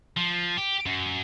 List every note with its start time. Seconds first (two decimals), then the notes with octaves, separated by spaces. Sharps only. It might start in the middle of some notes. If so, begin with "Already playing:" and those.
0.17 F3
0.57 G4
0.86 F#2